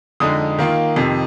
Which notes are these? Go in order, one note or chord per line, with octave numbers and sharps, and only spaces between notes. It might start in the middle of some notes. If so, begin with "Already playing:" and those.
F2 D3 G#3 D#4 D#6
D#3 A#3 F4
F2 C3 D#3